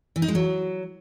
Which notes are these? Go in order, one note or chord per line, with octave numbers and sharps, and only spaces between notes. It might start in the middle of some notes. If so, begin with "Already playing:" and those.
E3
D#4
G#3
F#3